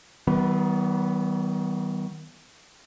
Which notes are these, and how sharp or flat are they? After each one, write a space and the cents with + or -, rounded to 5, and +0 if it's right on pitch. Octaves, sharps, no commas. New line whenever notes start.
D#3 +35 G3 -40 B3 +0